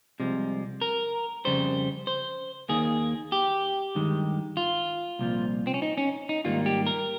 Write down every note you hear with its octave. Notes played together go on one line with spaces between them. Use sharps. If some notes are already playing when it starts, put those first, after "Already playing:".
C2 C3 F3 G#3
A#4
F2 C#3 G3 C5
C5
D#2 D#3 A#3 G#4
G4
G2 D#3 G#3
F4
C2 A#2 F3
C4
C#4
D#4
C#4
D#4
G#2 D#3 G3 A#3 F4
G4
A#4